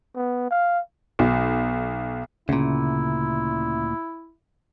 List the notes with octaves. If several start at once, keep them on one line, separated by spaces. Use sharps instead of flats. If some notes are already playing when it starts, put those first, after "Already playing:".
B3
F5
B1
D2 A#2 C#3 E4